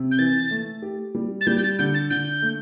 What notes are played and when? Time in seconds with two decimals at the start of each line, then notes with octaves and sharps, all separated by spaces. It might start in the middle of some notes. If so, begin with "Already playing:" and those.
Already playing: C3
0.11 G6
0.19 E3 A6
0.51 A3
0.82 G4
1.15 G3
1.41 A6
1.47 G3 G6
1.57 G6
1.63 A6
1.79 D3 G6
1.94 A6
2.10 D3 G6
2.42 A3